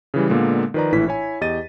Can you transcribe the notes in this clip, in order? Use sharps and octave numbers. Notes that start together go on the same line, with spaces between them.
C#3 E3 G3
A#2 D3 G#3 A#3 B3
D#3 F3 B4 D5 A#5
A#1 A2 E3 E4 B6
E4 C#5 G#5
E2 G4 D#5 A6 D#7